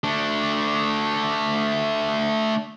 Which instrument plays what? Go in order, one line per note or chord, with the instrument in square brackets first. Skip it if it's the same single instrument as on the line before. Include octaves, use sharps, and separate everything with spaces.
[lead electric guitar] A3 D4